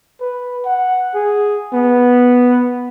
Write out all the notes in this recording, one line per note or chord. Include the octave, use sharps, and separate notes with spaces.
B4
F#5
G#4
B3